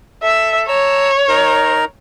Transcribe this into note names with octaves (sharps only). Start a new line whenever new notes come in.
A4 E5
C#5 A5 A#5 E6
D#4 A#4 A#5